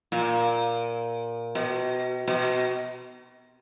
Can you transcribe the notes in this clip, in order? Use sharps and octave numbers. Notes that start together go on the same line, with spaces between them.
A#2
B2
B2